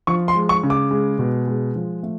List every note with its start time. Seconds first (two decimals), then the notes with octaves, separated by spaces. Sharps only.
0.07 F3 C#6
0.28 C6
0.35 G#3
0.49 C#6
0.63 C#3
0.70 D6
0.91 G#3
1.19 B2
1.48 G#3
1.75 F3
2.03 A3